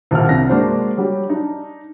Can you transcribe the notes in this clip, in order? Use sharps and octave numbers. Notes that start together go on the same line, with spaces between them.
D#1 D#2 F#5 F6
C2 G2 C3 A#6
G#3 A#3 D4 F#4 C5
F#3 G3 G4
D4 D#4